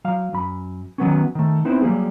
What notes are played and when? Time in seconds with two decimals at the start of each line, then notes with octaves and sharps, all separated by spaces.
0.05 F#3 F5
0.33 F#2 B5
0.98 D#3 F#3 B3 C#4
1.35 D#3 A3
1.65 B3 C4 D#4 E4 B4 C5
1.82 F#3 G3 A#3 G#4